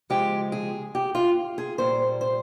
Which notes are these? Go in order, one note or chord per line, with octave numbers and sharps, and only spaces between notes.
C#3 F3 G#3 G4
G#4
G4
F4
G#4
A#2 G3 C5
C5